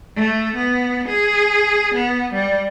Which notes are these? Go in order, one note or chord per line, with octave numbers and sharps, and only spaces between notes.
A3
B3
G#4
B3
G3